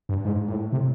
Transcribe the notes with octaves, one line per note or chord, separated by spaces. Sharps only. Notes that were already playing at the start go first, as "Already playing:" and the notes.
G2
G#2
A2
C3